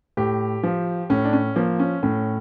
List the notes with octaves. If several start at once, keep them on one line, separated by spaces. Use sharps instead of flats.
A2 G4
F3
A2 C#4
D4
C#4
F3 A#3
C#4
A2 C#4